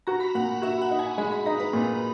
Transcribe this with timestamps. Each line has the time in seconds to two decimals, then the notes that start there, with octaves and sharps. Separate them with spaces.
0.07 F#4 A#5
0.20 B5
0.35 A#2 F#5
0.62 F#4 E5
0.82 F#5
0.91 D#4
0.99 G#5
1.18 G#3 B5
1.32 B5
1.46 D#4 A#5
1.60 B4
1.73 A#2